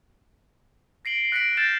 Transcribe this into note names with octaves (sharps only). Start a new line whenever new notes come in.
A#6 C7 D7 F#7 G7
F#6 A#6 B6 C#7 D7 F#7
F6 G6 A6 A#6 C7 E7